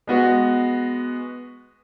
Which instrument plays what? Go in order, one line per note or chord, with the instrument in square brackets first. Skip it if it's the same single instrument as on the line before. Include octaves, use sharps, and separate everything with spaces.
[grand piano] G#3 B3 F#4